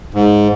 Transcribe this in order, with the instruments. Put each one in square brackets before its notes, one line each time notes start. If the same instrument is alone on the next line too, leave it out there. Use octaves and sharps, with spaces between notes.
[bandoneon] G#2